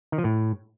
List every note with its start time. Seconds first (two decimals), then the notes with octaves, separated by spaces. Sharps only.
0.12 D#3
0.18 F3
0.24 A2